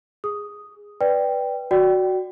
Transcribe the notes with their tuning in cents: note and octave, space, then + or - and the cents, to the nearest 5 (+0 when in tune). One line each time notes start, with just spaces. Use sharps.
G#4 -5 D#6 +0
B4 +0 D5 +0 G5 +0
F#4 +0 D5 +0 G5 -25